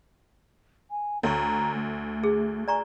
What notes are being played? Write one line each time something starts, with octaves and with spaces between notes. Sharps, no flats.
G#5
D2 C#5 A#5 C#6
A3
G#4
D5 G#5 A#5 C#6